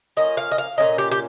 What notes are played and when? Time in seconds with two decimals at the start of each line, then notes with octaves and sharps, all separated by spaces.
0.17 F3 A#3 C#4 D#5
0.37 F5
0.52 D#5
0.58 F5
0.78 A#2 G3 C#4 D#5
0.98 G4
1.12 G4